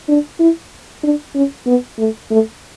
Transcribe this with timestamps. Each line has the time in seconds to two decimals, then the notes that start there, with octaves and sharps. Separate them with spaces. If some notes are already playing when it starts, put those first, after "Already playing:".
0.08 D4
0.40 E4
1.03 D4
1.35 C#4
1.66 B3
1.98 A3
2.31 A3